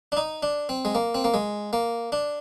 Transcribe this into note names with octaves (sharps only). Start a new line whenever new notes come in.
D4
D#4
D4
C4
G#3
A#3
C4
A#3
G#3
A#3
D4